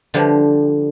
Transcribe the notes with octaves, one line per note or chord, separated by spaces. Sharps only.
D3 F3 G3